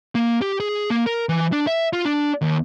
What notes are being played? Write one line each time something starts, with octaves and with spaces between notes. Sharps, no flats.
A#3
G4
G#4
A#3
A#4
E3
D4
E5
F4
D4
D#2